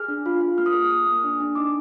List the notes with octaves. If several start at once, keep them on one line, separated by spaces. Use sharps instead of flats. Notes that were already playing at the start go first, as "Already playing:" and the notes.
Already playing: G#4 F6
D4
F4
F4
A#3 F6
D#6
G#4 F6
G#4 D#6
A#3
D4
D4
D#4 D6